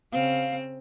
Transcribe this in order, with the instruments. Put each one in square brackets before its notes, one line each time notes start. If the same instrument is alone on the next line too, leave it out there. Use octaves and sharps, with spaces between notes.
[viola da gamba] C#3 C4 [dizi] F5